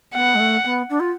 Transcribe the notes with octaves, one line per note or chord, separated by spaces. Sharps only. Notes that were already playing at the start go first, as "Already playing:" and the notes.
B3 F#5
G#3
A3
B3
D4
F4